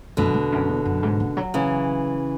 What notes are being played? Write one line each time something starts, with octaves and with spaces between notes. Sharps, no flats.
F#2 B2 D3
E2
F#2
E2
F#2
G#2
C#3
F#3
C#3 E3